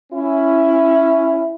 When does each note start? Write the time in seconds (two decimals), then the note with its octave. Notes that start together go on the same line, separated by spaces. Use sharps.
0.12 C#4 E4